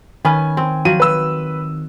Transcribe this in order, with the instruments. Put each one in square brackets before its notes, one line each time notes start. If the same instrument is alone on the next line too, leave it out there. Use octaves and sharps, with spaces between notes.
[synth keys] D#3 [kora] B3 C#4 B4 [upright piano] G#5
[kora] C4
[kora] F3 F#3 [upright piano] D#7
[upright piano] B4 E6